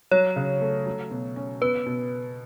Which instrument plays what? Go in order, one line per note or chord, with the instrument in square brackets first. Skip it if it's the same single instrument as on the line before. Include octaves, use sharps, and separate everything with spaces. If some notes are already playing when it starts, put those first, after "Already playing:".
[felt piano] F#3 [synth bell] C#5
[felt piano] C#3
A3
F#3
B2
C#4
[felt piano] B3 [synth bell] B4
[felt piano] B2